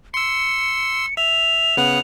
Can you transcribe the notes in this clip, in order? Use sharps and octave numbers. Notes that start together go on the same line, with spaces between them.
C6 E6 C#7
E5 F7
C#3 B3 F#5